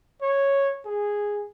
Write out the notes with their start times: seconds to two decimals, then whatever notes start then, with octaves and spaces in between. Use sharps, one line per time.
0.22 C#5
0.85 G#4